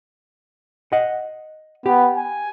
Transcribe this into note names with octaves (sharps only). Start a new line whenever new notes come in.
D#5 F#5
B3 G4
G#5